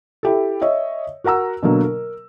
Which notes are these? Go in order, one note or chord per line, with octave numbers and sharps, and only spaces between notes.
E4 G4 A4
C#5 D#5 E5
F#4 A#4 F#5 A#5 E6
B2 D3 F#3 A#3
A#4